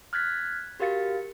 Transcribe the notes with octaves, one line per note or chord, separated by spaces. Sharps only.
F6 F#6 G#6 A6 B6
F#4 G4 A#4 F5 A6 C#7